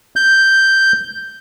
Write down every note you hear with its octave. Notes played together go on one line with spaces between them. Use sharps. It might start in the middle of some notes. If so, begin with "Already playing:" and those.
G6